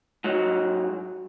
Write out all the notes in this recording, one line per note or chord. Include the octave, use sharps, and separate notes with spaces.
G#2 F#3